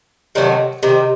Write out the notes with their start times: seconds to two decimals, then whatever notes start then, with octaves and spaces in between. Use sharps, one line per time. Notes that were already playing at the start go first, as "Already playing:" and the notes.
0.35 C3 D#3 F#3 A3
0.83 C3 D#3